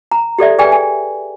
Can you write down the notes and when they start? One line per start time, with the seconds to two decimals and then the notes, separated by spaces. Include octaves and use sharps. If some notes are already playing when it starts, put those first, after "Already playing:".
0.12 A#5
0.39 G4 A4 D5 E5
0.59 G#4 B4 D5 G5 G#5
0.72 G#5